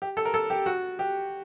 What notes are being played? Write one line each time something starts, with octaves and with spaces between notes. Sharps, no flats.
G4
A4
A#4
A4
G4
F#4
G4